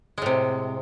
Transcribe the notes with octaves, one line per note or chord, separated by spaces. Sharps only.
A2 C3 G#3